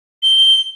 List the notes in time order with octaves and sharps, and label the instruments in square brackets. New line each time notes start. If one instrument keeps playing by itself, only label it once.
[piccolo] G7